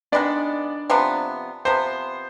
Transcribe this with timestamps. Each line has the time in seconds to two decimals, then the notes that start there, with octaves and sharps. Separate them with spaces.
0.12 D#3 G#3 B3 D4 D5
0.90 C3 F3 B3
1.65 C3 F3 B3 C5